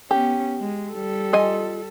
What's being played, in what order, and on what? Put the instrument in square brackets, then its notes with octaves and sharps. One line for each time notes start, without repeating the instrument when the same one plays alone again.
[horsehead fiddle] B3 C#4 [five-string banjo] G4
[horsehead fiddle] G#3
G3 A4
[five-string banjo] F4 D#5 G#5